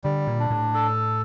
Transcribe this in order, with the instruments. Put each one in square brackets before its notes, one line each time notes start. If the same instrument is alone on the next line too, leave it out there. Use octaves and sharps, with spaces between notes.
[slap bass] D3 [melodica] G3
[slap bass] A#2
[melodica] D4
[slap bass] A2
[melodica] A4